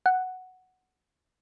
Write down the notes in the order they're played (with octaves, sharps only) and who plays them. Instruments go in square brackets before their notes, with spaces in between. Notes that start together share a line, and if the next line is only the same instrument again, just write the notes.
[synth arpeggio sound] F#5